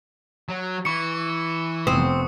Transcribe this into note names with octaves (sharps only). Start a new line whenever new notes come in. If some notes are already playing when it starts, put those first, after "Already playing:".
F#3
E3 C#6 C#7
F1 B3 C4 D#6